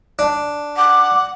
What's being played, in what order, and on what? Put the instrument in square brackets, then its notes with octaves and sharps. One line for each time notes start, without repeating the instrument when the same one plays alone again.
[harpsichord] D4
[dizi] F#5 [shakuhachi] D6